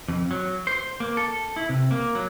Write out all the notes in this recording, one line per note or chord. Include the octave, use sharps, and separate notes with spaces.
F2
F#3
C5
A#3
A4
E4
C3
A#3
F#3